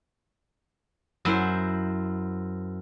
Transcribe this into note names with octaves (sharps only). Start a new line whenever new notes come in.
F#2 E4 C5